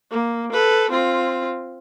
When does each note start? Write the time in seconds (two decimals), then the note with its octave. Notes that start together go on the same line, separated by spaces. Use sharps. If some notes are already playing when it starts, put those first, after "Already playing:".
0.11 A#3
0.52 A4 B4
0.91 C4 F4